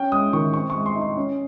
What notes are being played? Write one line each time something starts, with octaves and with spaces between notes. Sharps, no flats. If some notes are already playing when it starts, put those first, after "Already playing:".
Already playing: C#4 G5
G#3 D#6
D#3 C#6
C4 C#6
G#3 C#6
C6
D#4
C6
C#4